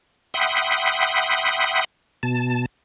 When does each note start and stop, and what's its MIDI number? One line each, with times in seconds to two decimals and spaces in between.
0.34 1.84 76
0.34 1.84 78
0.34 1.84 79
0.34 1.84 83
0.34 1.84 84
0.34 1.84 87
2.23 2.66 47
2.23 2.66 81